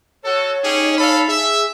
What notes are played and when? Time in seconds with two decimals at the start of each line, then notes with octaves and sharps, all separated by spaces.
0.24 F#4 A4 C#5
0.63 C#4 D#4 G4 G#4
0.98 A4 F5 B5
1.28 G#4 E5